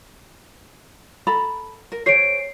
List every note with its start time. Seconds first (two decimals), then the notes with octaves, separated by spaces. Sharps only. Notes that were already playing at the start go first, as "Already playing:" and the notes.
1.27 A4 A#5 B5
1.92 A#4
2.06 G#4 C5 C#5 C7 D7